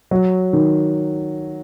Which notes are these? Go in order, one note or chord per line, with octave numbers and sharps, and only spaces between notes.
F#3
D#3